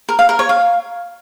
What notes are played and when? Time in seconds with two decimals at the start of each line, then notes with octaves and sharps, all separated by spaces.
0.09 A#4
0.19 F5
0.29 A#4
0.39 C#5
0.49 F5